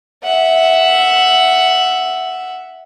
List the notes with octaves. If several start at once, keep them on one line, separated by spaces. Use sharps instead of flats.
E5 F#5